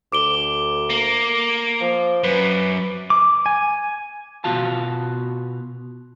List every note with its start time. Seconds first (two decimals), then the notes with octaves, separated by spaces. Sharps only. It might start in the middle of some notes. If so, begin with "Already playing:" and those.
0.12 D2 D6 D7 G7
0.90 A#3
1.81 F3
2.24 F#2 B4
3.10 D6
3.46 G#5
4.44 B2 F4 F#4 F5 A5